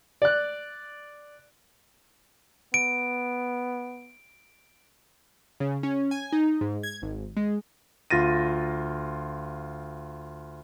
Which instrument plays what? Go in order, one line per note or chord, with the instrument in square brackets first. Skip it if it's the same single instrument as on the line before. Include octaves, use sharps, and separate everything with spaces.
[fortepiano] D5 F#6
[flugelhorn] B3 [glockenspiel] D7
[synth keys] C#3
C#4
G#5
D#4
G#2
G#6
G#1
G#3
[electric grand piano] D2 F4 A6 A#6 D#7